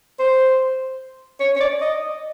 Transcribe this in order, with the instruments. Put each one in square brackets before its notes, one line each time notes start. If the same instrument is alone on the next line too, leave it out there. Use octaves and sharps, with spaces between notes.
[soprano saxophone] C5
C#5
C#5
D5
D#5